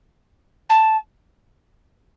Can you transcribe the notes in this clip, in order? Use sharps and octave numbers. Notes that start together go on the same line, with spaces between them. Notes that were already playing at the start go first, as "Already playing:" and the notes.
A5